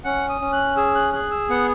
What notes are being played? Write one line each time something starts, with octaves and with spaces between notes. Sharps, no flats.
C#4 F#5
D#6
C#4
F#6
G#4 E6
F#6
G#4 F#6
E6
B3 F#5